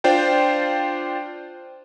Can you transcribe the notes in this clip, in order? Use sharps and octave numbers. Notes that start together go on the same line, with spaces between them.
D4 F4 C5 D5 G5